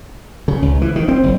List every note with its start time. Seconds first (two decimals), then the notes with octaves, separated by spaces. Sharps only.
0.48 C#3
0.62 C#2
0.81 E3
0.96 D#3
1.08 C4
1.23 F#1